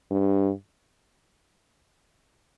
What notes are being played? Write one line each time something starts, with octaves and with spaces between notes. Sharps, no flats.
G2